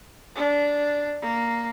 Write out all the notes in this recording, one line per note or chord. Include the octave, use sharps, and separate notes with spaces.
D4
A#3